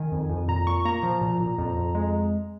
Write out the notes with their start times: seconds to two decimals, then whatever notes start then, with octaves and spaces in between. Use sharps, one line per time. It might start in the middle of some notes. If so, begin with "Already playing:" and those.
Already playing: D#3 G#5
0.12 F2
0.29 F2
0.48 A#2 A#5
0.67 A#2 C#6
0.85 A#3 A#5
1.03 F3
1.21 A#2
1.41 A#2
1.58 F2
1.77 F2
1.95 G#3